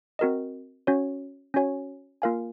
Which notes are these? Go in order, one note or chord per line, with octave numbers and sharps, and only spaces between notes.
C4 F#4 A#4 D#5
C#4 F#4 C#5
C#4 F#4 C#5 G#5
A#3 F4 A#4 F5 G#5